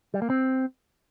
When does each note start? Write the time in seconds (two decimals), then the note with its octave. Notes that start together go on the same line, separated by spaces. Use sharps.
0.14 G3
0.22 A#3
0.30 C4